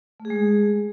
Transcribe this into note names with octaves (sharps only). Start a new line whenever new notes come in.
A3
G#4
G#3
G#4